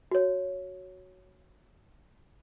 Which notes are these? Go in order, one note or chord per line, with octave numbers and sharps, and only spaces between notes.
F#4 C#5